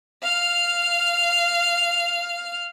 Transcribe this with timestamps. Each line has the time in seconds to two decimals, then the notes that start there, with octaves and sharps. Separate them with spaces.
0.23 F5 F6